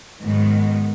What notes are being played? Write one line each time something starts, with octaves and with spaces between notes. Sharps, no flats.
G#2 D#3 F#3 G#3 B3